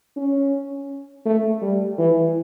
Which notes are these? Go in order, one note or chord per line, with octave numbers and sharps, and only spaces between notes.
C#4
A3
G3
E3